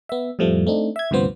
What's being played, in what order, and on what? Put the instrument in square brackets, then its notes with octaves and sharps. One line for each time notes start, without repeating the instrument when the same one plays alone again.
[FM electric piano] B3 E5
F2 A2 F3 G3 A3
A3 C4 D4 D#4
E5 G#6
D2 G2 C3 F3 B3 C5